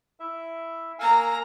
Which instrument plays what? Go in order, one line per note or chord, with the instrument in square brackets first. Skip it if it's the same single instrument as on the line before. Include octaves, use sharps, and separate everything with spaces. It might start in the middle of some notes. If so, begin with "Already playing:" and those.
[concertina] E4 E5
[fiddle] A#3 A#5 [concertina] F5 G#5 E6